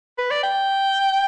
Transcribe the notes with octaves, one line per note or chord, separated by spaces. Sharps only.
B4
D5
G5